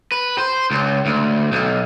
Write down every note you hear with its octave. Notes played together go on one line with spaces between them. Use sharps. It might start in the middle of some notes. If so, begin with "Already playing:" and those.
B4
C5
C#2
D2
B1